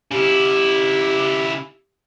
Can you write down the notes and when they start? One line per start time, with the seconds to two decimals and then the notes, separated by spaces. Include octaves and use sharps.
0.12 C#3 E4 G4